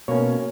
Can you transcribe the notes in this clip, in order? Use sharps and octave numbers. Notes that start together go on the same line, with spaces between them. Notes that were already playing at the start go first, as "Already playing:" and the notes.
B2 A#3 C#4 C#5